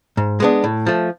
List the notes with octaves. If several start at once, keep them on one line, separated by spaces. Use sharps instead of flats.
G#2
G#3 B3 D4
A2
F3 A3